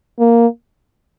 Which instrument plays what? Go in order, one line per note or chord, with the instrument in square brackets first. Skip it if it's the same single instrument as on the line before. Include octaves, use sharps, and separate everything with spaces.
[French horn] A#3